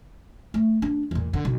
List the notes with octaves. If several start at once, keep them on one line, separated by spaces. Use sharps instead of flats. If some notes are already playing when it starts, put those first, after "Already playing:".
A3
D4
E2 A#2
D3
B1